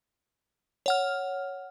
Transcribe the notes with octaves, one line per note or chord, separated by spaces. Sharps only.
C#5 F#5 F6